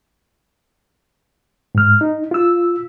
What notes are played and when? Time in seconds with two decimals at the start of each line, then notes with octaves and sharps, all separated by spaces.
1.75 G#2 F6
2.01 D#4
2.31 F4 E6